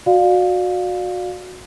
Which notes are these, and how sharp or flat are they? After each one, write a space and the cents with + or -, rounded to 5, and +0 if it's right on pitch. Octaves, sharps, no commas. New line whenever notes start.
F#4 -20 D5 +15 F5 +15